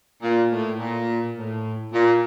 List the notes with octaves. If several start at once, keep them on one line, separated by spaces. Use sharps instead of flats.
A#2
A2
A#2
A2
A#2